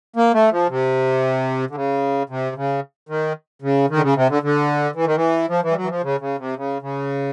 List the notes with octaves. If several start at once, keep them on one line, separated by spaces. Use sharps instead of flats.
A#3
A3
F3
C3
D3
C#3
C3
C#3
D#3
C#3
D#3
D3
C#3
C3
D3
D3
E3
D#3
E3
F3
E3
G3
F#3
E3
F3
C#3
C#3
C3
C#3
C#3